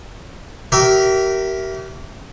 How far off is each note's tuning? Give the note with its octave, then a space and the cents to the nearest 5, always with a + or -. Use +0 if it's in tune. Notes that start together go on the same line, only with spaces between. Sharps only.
G4 -35 A#4 +0 E5 +0